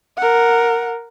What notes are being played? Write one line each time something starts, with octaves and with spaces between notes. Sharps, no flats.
A#4 F#5